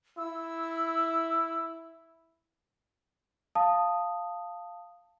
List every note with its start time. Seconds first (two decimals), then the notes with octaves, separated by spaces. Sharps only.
0.18 E4 E6
3.55 F5 A5 D#6